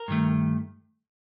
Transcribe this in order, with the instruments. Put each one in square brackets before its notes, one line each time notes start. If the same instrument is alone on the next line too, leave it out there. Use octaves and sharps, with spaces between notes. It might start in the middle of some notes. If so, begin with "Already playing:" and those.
Already playing: [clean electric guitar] A#4
G2 D#3 A3